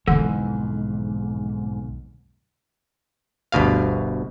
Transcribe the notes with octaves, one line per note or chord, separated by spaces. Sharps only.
B1 F2 G#2 D3 E3 E4
G1 D2 B2 F5